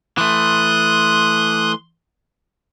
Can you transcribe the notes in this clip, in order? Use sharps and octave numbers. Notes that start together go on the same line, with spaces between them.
E3 A3 C6 D#6 F#6